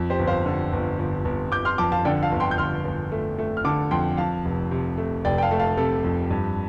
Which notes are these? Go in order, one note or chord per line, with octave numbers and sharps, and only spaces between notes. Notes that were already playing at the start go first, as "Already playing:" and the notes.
Already playing: F2
G4 C5
G1
C5 F5
D3
G1
G1
G1
G1 D6 G6
C6 F6
F2 A5 D6
F5 A5
D3 D5 G5
F5 A5
G1
G5 C6
G6
G1 C6 F6
G1
A3
A3
F6
D3 A5 D6
F2 G5 C6
F2 F5 A5
F1
C3
A3
F1 D5 G5
G5
F5 A5
A3
F5 A5
C3 A4
F2
G2